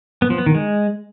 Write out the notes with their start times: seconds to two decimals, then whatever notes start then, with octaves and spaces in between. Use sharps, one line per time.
0.22 B3
0.30 F3
0.38 B3
0.46 D#3
0.55 G#3